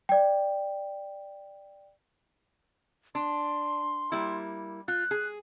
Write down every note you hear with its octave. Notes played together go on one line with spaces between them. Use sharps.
D5 G5
D4 C6
G3 A#3 E4
F4 F#6
G#4